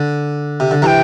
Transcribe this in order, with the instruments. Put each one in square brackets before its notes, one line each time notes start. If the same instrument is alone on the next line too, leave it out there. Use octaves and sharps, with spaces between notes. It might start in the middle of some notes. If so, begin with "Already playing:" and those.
Already playing: [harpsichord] D3
C3
D3
[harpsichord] C3 E3 [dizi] G5 A#5